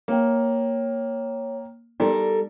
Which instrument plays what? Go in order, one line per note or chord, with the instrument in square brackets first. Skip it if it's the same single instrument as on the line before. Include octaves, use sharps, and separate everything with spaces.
[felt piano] A#3 [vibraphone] C#5 G5
[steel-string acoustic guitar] G3 A4 A#4 [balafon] B3 D#4 D5